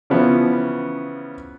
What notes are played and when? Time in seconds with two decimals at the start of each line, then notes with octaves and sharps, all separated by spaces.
0.10 C#3 E3 F3 B3